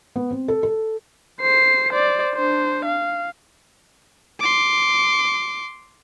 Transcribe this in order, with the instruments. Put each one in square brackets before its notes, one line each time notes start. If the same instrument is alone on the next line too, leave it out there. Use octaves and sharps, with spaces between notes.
[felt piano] B3
C4
A4
A4
[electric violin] C5 C7
C5 D5
D4 C5
F5
C6 D6